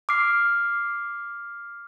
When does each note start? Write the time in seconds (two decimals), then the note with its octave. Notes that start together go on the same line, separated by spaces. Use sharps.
0.09 D6 F6 C7